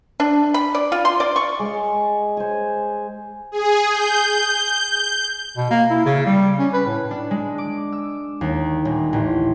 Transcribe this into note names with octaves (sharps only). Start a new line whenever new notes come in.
D4
B5
D5
F4
C6
D5
C#6
G#3
C5 G#5
G#4
G6
B2
A#3
E4
C#3
G3
C#4
B4
A2
D4
G#3
D6
E6
D#2
D#1
A1